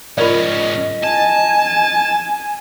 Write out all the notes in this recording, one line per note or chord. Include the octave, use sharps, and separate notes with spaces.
G#2 C#4 F4 A#4 D5 D#5
G#5 A5